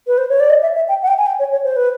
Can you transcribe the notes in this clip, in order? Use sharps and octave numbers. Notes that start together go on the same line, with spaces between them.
B4
C5
C#5
D5
D#5
E5
E5
G5
F#5
G5
G#5
G5
C#5
C#5
C5
B4